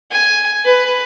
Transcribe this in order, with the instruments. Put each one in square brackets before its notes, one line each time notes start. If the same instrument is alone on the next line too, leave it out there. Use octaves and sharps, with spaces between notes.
[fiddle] G#5
B4